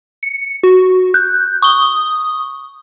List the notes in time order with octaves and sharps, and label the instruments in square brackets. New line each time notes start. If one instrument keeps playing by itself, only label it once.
[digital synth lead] C#7
F#4
[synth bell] F#6 [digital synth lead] G6
[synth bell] C#6 G7 [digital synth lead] D#6